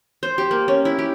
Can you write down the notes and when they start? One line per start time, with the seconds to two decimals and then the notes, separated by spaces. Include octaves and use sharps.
0.23 C5
0.38 G4
0.51 A#3
0.68 C#4
0.85 E4
0.99 G4